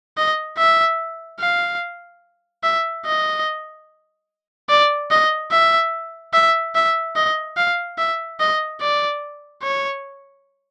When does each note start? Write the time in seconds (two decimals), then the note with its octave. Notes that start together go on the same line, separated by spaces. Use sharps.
0.17 D#5
0.58 E5
1.40 F5
2.63 E5
3.05 D#5
4.69 D5
5.11 D#5
5.51 E5
6.33 E5
6.75 E5
7.16 D#5
7.57 F5
7.98 E5
8.40 D#5
8.81 D5
9.62 C#5